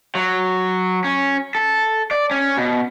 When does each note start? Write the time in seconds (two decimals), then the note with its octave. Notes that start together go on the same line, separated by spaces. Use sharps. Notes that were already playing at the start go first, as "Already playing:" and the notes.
0.15 F#3
1.04 C#4
1.55 A4
2.11 D5
2.31 C#4
2.57 B2